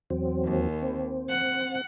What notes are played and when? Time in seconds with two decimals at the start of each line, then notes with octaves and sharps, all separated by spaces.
0.10 E2 F#3 C4
0.45 D#2
0.82 C4
1.30 F#5